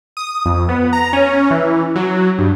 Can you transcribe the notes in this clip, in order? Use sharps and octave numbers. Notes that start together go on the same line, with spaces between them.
D#6
F2
B3
A#5
C#4
E3
F#3
G2